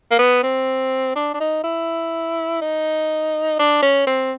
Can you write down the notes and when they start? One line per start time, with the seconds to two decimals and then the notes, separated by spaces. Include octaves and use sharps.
0.11 A#3
0.19 B3
0.43 C4
1.16 D4
1.34 D4
1.40 D#4
1.64 E4
2.61 D#4
3.59 D4
3.82 C#4
4.07 C4